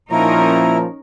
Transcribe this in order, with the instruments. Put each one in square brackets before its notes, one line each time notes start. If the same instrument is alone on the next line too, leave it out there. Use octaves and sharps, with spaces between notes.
[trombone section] A#2 F3 [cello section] C#4 D#4 A#4 [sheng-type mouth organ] E4 [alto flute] A#5